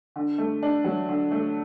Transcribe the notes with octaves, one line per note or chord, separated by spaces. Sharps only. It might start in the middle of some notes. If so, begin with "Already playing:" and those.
D3
A3
D4
F#3
D3
A3